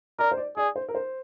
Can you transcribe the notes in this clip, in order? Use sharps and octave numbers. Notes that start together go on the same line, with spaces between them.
A#4 D5
C5
D5
G#4 D5
C5
A#4
C5